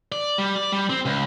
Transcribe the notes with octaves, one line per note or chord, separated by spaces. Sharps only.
D5
G3
D5
G3
C4
C#2